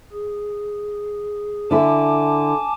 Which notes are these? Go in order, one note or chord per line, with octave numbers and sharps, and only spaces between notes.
G#4
D3 E4 G#5 A5 D6